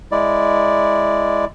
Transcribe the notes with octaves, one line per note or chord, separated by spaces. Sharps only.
G#3 E4 D5